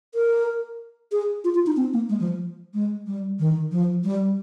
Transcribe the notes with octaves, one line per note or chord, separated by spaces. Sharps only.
A#4
G#4
F4
F4
D#4
C4
A#3
G#3
F3
G#3
G3
D#3
F3
G3